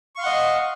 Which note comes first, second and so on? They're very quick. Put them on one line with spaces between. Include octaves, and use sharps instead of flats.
C#6 F5 C6 F#5 D#5